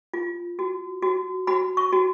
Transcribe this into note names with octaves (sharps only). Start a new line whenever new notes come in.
F4
F#4
F#4
F#4 B5
C#6
F#4